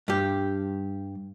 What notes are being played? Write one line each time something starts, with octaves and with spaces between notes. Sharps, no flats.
G2 G4